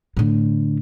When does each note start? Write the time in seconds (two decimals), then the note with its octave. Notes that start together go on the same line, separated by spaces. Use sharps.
0.17 A2 D3